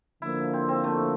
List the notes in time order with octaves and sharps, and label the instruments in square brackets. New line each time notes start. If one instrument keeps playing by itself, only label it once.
[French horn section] D3 F3 A#3 [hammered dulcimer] E4
[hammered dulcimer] C4
C4
A3